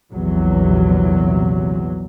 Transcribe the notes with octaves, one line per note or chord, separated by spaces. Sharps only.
A#1 E2 C3 F#3